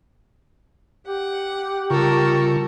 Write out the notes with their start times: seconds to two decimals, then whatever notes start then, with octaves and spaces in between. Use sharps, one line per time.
1.07 G4 F#5
1.90 C#3 G3 F4 A4 A#4 C#6